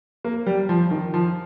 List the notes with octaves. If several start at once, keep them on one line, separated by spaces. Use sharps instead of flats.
A#3
G3
F3
D#3
F3